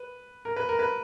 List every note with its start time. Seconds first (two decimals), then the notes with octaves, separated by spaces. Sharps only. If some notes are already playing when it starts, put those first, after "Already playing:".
Already playing: B4
0.45 A#4
0.56 B4
0.69 A#4
0.79 B4